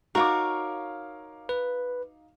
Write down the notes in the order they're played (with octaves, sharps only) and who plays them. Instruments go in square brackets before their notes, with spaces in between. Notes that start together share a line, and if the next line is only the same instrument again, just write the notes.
[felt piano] D#4 F5 D6 [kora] F#4 [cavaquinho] A#4 C#5
[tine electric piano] B4